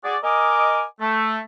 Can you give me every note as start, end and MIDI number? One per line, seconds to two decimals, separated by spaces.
0.04 0.17 66
0.04 0.17 68
0.04 0.17 74
0.23 0.84 70
0.23 0.84 75
0.23 0.84 80
0.23 0.84 86
1.00 1.39 57